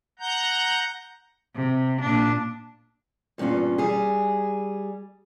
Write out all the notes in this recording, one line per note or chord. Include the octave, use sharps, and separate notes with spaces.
F#5 A#5 G6
C3
A#2 D4
E2 G2 A#2 C#4 F4
G3 G#4